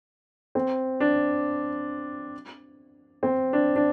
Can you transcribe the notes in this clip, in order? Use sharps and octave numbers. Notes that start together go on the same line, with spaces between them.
C4
D4
C4
D4
D4